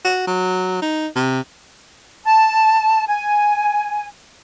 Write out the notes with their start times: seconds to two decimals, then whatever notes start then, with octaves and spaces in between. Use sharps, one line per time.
0.04 F#4
0.27 F#3
0.82 D#4
1.15 C3
2.24 A5
3.08 G#5